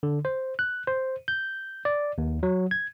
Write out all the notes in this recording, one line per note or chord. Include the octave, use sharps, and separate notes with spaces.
D3
C5
F#6
C5
G6
D5
D#2
F#3
G#6